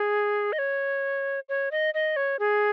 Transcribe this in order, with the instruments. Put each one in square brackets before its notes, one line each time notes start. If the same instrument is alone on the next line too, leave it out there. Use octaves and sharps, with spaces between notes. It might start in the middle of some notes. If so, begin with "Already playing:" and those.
Already playing: [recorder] G#4
D#5
C#5
C#5
D#5
D#5
C#5
G#4